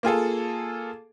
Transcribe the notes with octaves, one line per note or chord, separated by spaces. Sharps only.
A#3 F4 G#4 A4